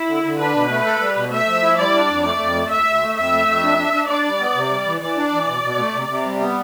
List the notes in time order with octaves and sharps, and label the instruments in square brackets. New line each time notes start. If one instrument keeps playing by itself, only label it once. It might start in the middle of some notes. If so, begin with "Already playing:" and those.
Already playing: [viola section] E4
[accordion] D3
D3
[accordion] D4 [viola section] B4
[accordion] B2
A3
A4
G3
B2
[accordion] A3 [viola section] E5
[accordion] F3
E4
[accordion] G3 [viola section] D5
[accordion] D4
F2
[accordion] A3 [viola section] D5
[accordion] F2
A3
[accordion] D2 [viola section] E5
[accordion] D2
A3
[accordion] F2 [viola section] E5
[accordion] A3
F2
D4
D4
D4
[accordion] D4 [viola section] D5
[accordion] G3
B3
C3
G3
E3
[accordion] E3 [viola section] D5
[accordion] D4
E3
B2
B2
A3
C3
C3
G3
B3